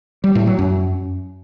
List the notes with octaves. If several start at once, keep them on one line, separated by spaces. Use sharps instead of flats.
G3
A2
F#3
F#2